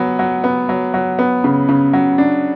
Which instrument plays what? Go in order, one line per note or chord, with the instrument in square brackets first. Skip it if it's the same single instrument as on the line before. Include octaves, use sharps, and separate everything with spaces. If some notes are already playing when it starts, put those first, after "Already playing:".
Already playing: [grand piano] F#3 B3
F#3
B3
F#3
F#3
B3
C#3
C#3
F#3
D4